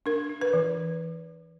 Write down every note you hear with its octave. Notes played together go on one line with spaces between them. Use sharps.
D4 A#4
D4
B4
E3